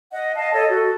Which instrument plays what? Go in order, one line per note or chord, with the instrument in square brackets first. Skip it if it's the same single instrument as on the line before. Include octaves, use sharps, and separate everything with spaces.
[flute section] D#5 F#5
D#5 F5 A5
A4 C#5 D#5
F#4 A4